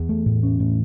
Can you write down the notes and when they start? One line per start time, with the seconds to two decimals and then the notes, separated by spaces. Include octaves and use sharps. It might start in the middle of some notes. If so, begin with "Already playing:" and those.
Already playing: E2
0.09 A3
0.26 A2
0.43 C#4
0.60 A2